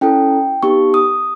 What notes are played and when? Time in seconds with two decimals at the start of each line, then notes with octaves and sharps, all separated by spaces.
0.01 C#4 E4 A4 G5
0.63 B3 D#4 G4 C#6
0.94 D#6